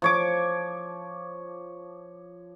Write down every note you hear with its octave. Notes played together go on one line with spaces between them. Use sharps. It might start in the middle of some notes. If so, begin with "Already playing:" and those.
F3 C#5 D6